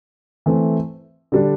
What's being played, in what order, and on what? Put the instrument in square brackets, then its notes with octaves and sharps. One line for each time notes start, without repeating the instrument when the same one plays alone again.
[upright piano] E3 A3 C4
D3 G3 D4